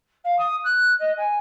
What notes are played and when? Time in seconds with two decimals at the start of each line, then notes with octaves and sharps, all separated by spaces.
0.24 F5
0.38 D#6
0.64 F#6
0.99 D#5
1.17 G#5